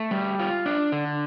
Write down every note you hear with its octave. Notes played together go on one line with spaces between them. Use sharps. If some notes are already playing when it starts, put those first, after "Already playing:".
Already playing: A3
G3
F4
D4
D3